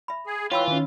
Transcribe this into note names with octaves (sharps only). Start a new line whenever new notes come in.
E5 B5
G#4
E3 F4 C#5 F5 G5 B5 E6
D#3 C#4